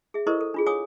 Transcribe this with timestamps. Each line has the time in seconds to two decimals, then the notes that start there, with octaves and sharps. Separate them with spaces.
0.14 G#4 E5
0.27 E4 A4 A#4 C5 D#5 C#6
0.41 A4
0.54 D4 F4 G#4
0.66 C#5 F5 G#5 D6 D#6